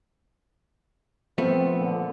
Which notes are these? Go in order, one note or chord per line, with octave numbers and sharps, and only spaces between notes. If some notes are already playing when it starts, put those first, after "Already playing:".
F3 A3 B3 C4
A#2 D3